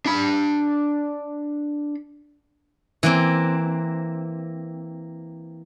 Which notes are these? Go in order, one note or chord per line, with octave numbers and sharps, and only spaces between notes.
D4 B5
E3 A#3 C4